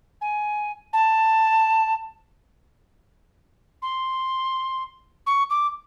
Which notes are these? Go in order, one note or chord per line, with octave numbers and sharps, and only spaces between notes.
G#5
A5
C6
C#6
D6